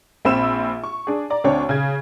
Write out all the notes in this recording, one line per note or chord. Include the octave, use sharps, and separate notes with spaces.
A#1 C4 B5 E6 E7
C#6
D4 G#4
D5 A#5
D2 C4 D4 C#5
C#3 G#6